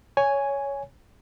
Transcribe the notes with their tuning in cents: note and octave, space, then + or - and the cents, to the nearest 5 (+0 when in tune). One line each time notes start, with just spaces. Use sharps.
C#5 +10 G#5 +0